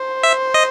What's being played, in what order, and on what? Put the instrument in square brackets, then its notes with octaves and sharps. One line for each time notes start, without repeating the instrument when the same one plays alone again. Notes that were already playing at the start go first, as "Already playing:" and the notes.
Already playing: [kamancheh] C5
[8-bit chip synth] E5
D#5